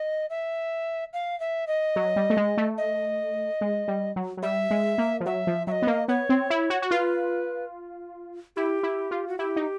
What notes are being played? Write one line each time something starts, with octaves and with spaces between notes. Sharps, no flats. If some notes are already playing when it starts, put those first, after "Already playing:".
Already playing: D#5
E5
F5
E5
D#5
F#3
G3
A3
G#3
A3
D#5
G#3
G3
F#3
F#3
G3 E5
G#3
A#3
F3
F#3 E5
F3
F#3 D#5 E5
B3
A#3
B3 C#5
C4
E4
F#4
F#4
F4 B4
E4 G4
E4
F4
F#4
E4 G4
D#4